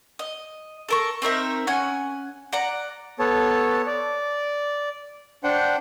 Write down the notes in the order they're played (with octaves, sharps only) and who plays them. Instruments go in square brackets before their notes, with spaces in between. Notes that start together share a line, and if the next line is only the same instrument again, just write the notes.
[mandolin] D#5
A4 A#4 C#6
C4 D#4 A#4 E5
C#4 F#5 G#5
D5 F#5 A#5
[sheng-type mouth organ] B3 A4 C#5 A5
D5
D4 C5 F#5 G5